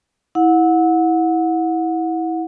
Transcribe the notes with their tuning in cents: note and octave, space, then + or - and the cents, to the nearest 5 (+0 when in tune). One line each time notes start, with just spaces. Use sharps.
E4 -20 F#5 -25